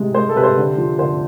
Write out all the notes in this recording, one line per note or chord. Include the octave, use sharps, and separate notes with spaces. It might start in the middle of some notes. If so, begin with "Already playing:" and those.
Already playing: A2 C3 G#3
G#3 C5
A4
C3 B4
C5
D3
F3
D3 C5